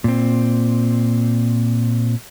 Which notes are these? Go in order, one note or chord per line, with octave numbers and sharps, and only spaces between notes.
A#2 C4